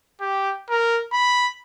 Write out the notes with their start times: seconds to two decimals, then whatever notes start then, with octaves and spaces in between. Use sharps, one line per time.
0.21 G4
0.70 A#4
1.13 B5